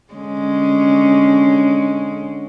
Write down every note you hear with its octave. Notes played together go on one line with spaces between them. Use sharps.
D3 G#3 C#4